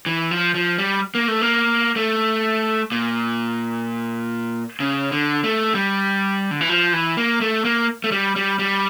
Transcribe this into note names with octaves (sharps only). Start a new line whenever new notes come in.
E3
F3
F3
G3
A#3
A3
A#3
A3
A#2
C#3
D3
A3
G3
D3
E3
F3
E3
A#3
A3
A#3
A3
G3
G3
G3